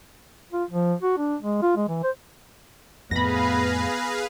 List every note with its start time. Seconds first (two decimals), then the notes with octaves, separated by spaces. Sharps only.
0.53 F4
0.70 F3
1.03 F#4
1.18 D4
1.42 G#3
1.62 F4
1.76 G#3
1.88 E3
2.03 C5
3.11 F2 A2 B3 G#4 B4 F5 B5 A#6